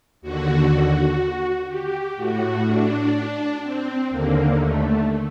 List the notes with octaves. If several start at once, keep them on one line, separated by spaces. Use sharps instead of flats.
D#2 D3 F#4
G4
A2 F#4
D4
C4
D#2 D3 A#3
A3